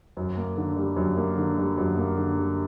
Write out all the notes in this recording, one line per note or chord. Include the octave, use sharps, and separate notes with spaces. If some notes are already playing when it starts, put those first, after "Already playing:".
F#2
A#3
D3
G3
F#2
A#3
D3
G3
F#2
A#3
D3
G3